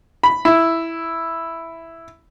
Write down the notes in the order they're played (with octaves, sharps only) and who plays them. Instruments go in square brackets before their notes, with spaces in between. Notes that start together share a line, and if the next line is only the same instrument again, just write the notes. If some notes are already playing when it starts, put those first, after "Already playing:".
[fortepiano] B5
E4